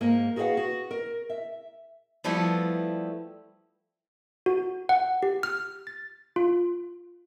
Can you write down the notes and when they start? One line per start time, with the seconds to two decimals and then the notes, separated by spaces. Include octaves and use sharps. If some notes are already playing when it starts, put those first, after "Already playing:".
0.01 G#2 A#3
0.36 F#4 G#4 B4 C#5 F5 F#5
0.57 F#4
0.91 A#4
1.30 E5
2.24 F3 G3 A3 B3 E4 G4
4.46 F#4
4.89 F#5
5.23 G4
5.43 F6
5.87 A6
6.36 F4